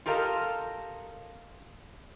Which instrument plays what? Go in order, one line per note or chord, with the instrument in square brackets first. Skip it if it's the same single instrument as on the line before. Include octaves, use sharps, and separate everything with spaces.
[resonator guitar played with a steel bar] F4 G4 A4 A#4 D#5 F5